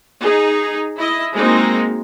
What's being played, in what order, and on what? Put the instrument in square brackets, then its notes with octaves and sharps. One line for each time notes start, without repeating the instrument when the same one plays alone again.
[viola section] D#4 G#4
E4 D#5
G#3 A#3 C4 D#4 F#4